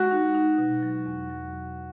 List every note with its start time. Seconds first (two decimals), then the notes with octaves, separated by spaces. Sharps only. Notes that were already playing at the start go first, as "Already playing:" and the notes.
Already playing: G#3 F#4
0.11 D#4
0.35 D#4
0.58 B2
0.83 F#3
1.06 E2
1.30 F#3
1.54 B2